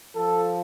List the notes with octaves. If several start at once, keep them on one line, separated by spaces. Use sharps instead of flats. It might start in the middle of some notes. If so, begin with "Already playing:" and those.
F3 A4